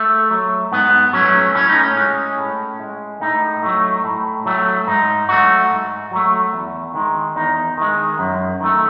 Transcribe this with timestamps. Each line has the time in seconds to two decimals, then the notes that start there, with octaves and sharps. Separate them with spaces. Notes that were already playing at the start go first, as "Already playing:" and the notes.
Already playing: A3
0.31 F#3 A3
0.72 G#2 B3
1.13 F#3 A3 C#4
1.55 A2 C#4
1.69 D#4
1.83 C#4
1.97 G#3
2.38 A2
2.80 G#3
3.21 A2 D#4
3.63 F#3 A3
4.04 A2
4.46 F#3 A3
4.87 G#2 D#4
5.28 F#3 A3 F#4
5.70 G#2
6.11 F#3 A3
6.53 E2
6.94 D#3 G#3
7.36 E2 D#4
7.77 D#3 G#3
8.19 F#2
8.60 D#3 A3